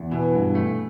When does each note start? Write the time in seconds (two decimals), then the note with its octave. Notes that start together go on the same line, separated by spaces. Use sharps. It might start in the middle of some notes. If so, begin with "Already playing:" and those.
Already playing: E2
0.11 B2 E3
0.34 G2
0.55 A3